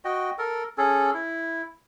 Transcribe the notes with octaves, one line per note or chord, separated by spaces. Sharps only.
F#4 D#5 G5
A4 A#4
C#4 G#4 A4
E4